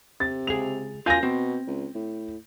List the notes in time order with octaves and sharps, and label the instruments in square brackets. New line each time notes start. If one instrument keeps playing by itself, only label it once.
[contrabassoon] C3 [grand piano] A6
[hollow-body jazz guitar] C#2 G#4 [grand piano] F7
[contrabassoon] F#2 [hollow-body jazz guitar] F4 F5 G#5 [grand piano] G6 A#6
[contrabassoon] B2 [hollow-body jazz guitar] C4
[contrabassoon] C#2
A2